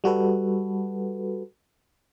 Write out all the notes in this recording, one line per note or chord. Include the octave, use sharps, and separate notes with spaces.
G3 F#4 A4 B4